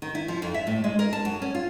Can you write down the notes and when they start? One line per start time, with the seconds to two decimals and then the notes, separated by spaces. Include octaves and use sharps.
0.02 D#3
0.15 E4
0.28 F3
0.42 F2
0.54 E5
0.67 A2
0.84 G#3
0.99 A#4
1.13 A5
1.25 F#2
1.42 C#4
1.55 F4